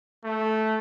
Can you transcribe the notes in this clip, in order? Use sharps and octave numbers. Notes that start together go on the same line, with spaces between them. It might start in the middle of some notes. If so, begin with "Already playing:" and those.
A3